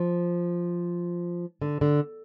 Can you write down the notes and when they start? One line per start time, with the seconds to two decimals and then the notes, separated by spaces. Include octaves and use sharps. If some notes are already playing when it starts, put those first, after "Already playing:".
Already playing: F3
1.62 D3
1.81 D3